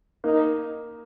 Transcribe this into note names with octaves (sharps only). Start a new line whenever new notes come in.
A#3 D#4